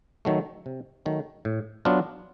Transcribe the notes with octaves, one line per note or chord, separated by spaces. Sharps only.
D#3 F#3 A3
C3
D#3 F#3 A3
A2
F#3 B3 D4 F4